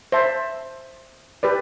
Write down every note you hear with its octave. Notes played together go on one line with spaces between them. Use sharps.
C5 E5 A5
G4 B4 D5